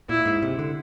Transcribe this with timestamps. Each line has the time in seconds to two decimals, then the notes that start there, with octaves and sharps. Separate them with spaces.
0.09 A#2 E4
0.25 G#2
0.42 C3
0.59 D3